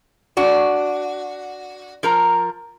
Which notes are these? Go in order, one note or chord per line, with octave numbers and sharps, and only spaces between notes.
D4 F#4
F3 A#4 A#5